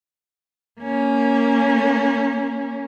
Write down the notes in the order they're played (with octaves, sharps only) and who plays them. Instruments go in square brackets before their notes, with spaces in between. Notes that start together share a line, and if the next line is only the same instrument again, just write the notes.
[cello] A#3 C#4